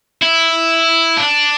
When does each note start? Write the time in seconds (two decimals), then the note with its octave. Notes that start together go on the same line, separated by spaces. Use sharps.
0.22 E4
1.17 D4